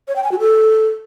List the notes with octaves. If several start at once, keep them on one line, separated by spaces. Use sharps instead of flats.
C#5
G5
G#5
F#4
A4